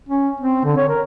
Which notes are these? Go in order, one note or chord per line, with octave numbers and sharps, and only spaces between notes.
C#4
C4
D3
C#5
A#4